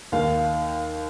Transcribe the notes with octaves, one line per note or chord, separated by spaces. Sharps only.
D#2 D#3 F5